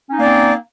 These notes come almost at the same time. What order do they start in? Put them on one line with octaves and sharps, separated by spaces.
C#4 D#4 A#3 D5 C4